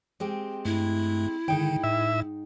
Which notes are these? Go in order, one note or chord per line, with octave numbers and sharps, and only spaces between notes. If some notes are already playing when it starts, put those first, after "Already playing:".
G#3 C4 G4
G2 A3 E4
G#2 D3 D#3 D#4 G5
A2 E5